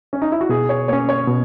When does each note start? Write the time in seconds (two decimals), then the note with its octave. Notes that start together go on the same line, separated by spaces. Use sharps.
0.13 C#4
0.22 D#4
0.32 E4
0.41 F#4
0.49 B2 G#4
0.69 C#5
0.88 A#3 C#4 C#5
1.09 C#5
1.27 B2